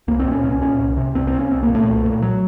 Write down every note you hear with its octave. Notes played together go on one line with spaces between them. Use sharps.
C2 A#3
C4
A#2
C#4
C2 C#4
A#2 C#4
C2
C3
C2 C4
C4
C3
C#4
C2 C4
A#3
A#2
A3
C2
A#2
F#3